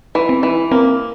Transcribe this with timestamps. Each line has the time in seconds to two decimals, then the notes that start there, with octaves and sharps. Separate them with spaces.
0.15 E3
0.29 C4
0.43 E3
0.71 A#3 C4